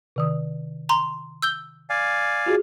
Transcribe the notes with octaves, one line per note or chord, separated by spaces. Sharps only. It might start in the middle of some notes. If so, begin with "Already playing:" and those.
C3 D#3 D#6
A#5 C6
E6 G6 G7
D5 F5 G#5
F4 F#4 G#4